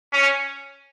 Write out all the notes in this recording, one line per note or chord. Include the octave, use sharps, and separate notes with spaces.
C#4